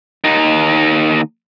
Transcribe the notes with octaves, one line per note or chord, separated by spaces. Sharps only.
D#2 D#4